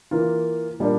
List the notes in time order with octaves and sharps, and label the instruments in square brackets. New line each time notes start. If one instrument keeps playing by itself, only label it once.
[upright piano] E3 A#3 F4 A#4
A#2 G3 A#3 D4